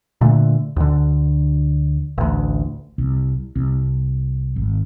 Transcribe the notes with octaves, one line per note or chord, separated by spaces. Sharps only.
A#2 D3 A3
D2 D3
A1 D2
C2
C2
G#1